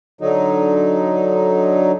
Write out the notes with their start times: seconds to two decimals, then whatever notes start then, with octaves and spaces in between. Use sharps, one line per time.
0.21 D3 F#3 D#4